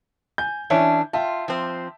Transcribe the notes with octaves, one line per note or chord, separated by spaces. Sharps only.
G#5 G6
E3 C#4 D4 E4 C#5
F4 E5 G5 A5
F3 C4